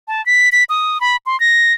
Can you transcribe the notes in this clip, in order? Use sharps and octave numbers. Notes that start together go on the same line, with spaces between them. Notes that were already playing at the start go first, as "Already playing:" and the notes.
A5
B6
B6
D#6
B5
C6
A#6